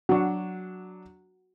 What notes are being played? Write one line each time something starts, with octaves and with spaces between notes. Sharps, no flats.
F#3 D4 F#4